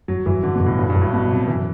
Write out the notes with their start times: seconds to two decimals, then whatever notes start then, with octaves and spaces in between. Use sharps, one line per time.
0.08 G1 F#3
0.26 G1 E3
0.43 G1 D3
0.55 B2
0.60 G1
0.66 A2
0.78 G2 F#3
0.90 G2
0.95 G1
1.01 A2
1.13 B2 F#3
1.30 C3 F#3
1.48 F#2 E3